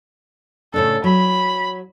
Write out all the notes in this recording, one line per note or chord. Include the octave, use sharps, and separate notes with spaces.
A2 C#3 D4 A4
F#3 B5